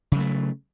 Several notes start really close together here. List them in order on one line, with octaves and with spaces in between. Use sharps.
C#3 F#3 A3